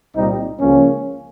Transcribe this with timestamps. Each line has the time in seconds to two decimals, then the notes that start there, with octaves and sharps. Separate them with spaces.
0.15 C2 A#2 G3 C4 D#4
0.59 C#2 C#3 F3 A#3 C#4